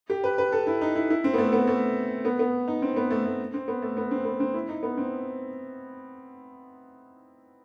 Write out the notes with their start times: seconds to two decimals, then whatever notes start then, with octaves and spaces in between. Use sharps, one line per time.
0.10 G4
0.24 B4
0.38 B4
0.52 A4
0.67 E4
0.81 D#4
0.95 E4
1.10 E4
1.24 C4
1.34 B3
1.38 A3
1.53 B3
1.67 A3
2.25 B3
2.39 B3
2.68 D#4
2.82 C4
2.96 B3
3.11 A3
3.25 A3
3.54 C4
3.68 B3
3.82 A3
3.97 B3
4.11 C4
4.25 B3
4.40 C4
4.54 E4
4.69 D#4
4.83 B3
4.97 C4